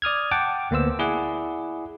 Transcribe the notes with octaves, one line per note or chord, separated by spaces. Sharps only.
D5 D#6 F6 G#6
F#5 G5 A5 D6
D2 A#3 B3 C5 E6
E4 G#4 D5 F#5